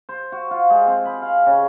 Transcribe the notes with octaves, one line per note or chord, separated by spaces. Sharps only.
C5
F#4
F4
G#3
C4
B5
F5
C#3